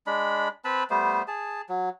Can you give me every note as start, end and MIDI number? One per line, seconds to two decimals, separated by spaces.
0.07 0.48 56
0.07 0.48 62
0.07 0.48 83
0.65 0.84 60
0.65 0.84 71
0.65 0.84 81
0.65 0.84 83
0.90 1.22 55
0.90 1.22 57
0.90 1.22 59
0.90 1.22 72
1.28 1.62 68
1.28 1.62 81
1.69 1.89 54